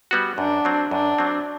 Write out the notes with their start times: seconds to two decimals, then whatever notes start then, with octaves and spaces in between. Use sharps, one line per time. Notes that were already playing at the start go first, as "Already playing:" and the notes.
0.11 G3 B3 F#4
0.38 F#2 D4
0.65 F#3 C4
0.91 F#2 D4
1.18 F#3 C4